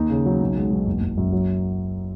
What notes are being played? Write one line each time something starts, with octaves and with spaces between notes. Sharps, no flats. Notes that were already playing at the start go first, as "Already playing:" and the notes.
Already playing: D#2 D#4
C#3
F#3
B1
G#3
B1
F#1
F#1
F#2
F#3